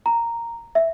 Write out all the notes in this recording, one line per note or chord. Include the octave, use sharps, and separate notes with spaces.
A#5
E5